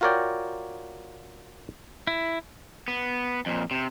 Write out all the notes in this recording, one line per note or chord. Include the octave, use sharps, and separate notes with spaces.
F4 F#4 A#4 C#5 D5 G5
E4
B3
F2 A#2
C3